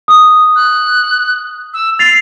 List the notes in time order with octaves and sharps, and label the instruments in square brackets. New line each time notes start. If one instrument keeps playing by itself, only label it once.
[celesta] D#6
[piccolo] F#6
E6
[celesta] A6 C7 [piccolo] F7